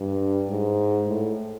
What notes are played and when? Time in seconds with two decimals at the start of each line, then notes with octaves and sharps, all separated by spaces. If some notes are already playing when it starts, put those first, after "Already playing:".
Already playing: G2
0.49 G#2
1.07 A2